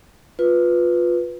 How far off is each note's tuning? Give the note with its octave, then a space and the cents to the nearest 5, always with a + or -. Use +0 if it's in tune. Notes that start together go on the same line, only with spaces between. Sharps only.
F4 +20 B4 +0